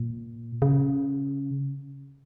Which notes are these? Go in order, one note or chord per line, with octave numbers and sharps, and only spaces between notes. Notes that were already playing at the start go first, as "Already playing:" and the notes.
Already playing: A#2
C#3